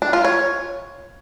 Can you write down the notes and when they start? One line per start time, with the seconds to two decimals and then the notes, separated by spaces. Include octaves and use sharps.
0.02 D4
0.13 F4
0.24 C#5